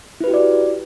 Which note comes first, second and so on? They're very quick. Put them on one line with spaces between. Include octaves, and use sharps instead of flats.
E4 B4 G4 F#4 D5